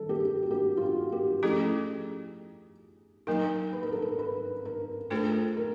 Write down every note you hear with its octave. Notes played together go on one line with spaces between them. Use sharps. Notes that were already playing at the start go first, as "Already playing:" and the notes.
Already playing: D#3 G3 A4
G4
G#4
F#4
G4
F4
F#4
G4
F3 A3 C#4 E4 G#4 A4
F#3 A#3 D#4 A#4
B4
A#4
A4
A#4
B4
A#4
A3 D4 F4 G#4 A4 C5
A#4